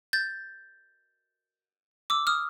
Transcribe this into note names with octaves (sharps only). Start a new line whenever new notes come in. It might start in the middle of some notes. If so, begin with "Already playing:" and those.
G6 A6
D6 E6
D#6 F6